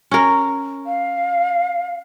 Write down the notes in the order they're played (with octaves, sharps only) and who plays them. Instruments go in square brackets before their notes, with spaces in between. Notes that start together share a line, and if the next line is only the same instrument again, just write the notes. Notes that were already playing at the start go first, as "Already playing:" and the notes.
[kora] C#4 A#4
[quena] F5